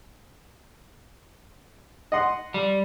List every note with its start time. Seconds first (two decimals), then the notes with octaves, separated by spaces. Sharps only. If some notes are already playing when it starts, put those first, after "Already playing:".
2.12 D#5 F#5 C6
2.54 G3